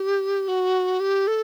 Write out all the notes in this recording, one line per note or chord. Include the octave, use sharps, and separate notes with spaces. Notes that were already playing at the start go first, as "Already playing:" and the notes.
Already playing: G4
F#4
G4
A4